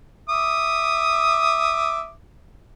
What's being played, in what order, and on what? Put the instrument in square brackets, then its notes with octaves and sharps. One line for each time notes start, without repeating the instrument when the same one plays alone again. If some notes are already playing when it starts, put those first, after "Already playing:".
[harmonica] E5 D6 D#6